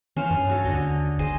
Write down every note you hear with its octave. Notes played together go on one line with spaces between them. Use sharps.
E3 C#4 C5 F5
G2
F#4 A4 C#5
D#2 D3 C#5 D#5
G#1 G#4 C5 D#5